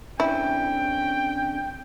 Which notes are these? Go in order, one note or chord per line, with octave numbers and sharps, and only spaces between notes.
D3 C4 C#4 E4 G5